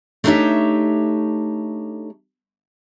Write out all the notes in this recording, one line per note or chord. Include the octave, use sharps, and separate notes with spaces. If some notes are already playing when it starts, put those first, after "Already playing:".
A3 D4 D#4 G4 C#5 E5